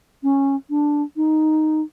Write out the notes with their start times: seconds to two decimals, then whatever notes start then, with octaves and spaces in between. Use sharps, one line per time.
0.23 C#4
0.70 D4
1.16 D#4